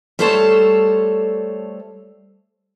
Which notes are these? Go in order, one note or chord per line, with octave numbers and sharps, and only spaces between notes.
G3 A3 A4 C5 C#5 A5